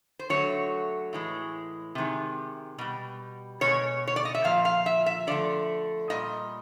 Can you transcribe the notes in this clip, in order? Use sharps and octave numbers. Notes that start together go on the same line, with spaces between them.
C5
D3 F#3 A3 C#5
A2 E3 G#3
C3 D#3 G#3
B2 G3
B2 G#3 C#5
C#5
D5
D#5
E5
A#2 F3 F5
F5
E5
E5
D3 F3 A3 D5
A#2 G3 D#5